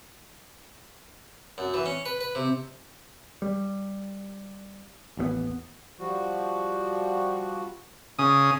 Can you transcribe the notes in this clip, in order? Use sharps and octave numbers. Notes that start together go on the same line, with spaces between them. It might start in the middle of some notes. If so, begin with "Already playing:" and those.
F#2
E3
C#4
B4
B4
C3
G3
A1 D#2 A3 B3
F3 G3 F#4
C#3 D#6